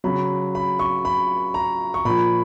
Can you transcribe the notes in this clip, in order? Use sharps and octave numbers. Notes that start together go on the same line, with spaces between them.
C#3 F#3 B5
B5
C#6
B5
A#5
C#6
A#2 F3 B5